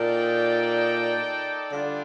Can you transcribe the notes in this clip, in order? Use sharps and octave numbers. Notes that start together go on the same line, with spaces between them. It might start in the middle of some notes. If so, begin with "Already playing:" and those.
Already playing: A#2 D#4 A4 D5 G5
D3 G3 D4 F4